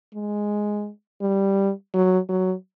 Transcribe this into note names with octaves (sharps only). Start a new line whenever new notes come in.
G#3
G3
F#3
F#3